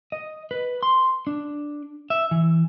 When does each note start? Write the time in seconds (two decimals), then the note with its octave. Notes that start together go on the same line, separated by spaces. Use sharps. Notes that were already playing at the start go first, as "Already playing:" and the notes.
0.12 D#5
0.51 B4
0.83 C6
1.27 D4
2.10 E5
2.31 E3